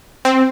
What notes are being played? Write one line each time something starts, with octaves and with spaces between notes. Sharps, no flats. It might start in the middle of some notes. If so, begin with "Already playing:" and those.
C4